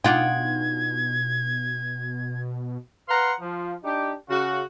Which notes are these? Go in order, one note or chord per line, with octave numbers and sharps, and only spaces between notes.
B2 D4 D#4 F4 F#5 G5 G#6
B4 F5 F#5 A#5 C6
F3
D4 D#4 G4
C#3 F#4